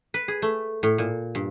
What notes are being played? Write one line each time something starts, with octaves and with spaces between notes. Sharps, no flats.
B4
G#4
A3
A2
A#2
G2